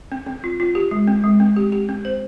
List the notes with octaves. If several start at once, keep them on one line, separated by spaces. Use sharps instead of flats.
C4
C4
F4
F4
G4
G#3
C4
G#3
C4
G4
G4
C4
C5